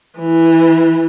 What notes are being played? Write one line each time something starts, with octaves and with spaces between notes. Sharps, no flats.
E3